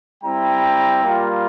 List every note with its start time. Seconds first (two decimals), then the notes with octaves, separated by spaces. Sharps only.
0.23 G3 C4 E4 G5 A#5
1.03 G3 A#3 F4